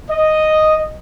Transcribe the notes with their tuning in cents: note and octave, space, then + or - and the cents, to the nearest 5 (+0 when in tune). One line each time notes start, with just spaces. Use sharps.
D#5 -5